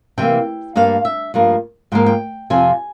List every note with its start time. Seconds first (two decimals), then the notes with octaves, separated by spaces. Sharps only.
0.18 C3 E3 A#3 G5
0.76 G2 G3 A#3 F5
1.05 E5
1.34 G2 F3 A#3
1.92 G#2 F3 A#3 G5
2.06 G5
2.50 F2 C3 F3 G#5